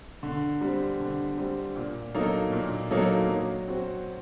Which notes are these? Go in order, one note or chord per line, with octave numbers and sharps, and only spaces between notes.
D3
G3 C4
D3
G3 C4
A#2
F#3 A#3 D#4 A4
A#2
F#3 A#3 D#4 A4
F#3
C4 F#4